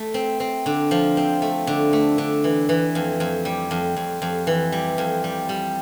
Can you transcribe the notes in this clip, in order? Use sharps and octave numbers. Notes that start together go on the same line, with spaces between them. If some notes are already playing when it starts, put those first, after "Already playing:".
Already playing: A3
C4
C4
D3
F3
C4
A3
D3
A3
D3
E3
E3
F2
F2
G3
F2
F2
F2
E3
G3
F2
G3
G3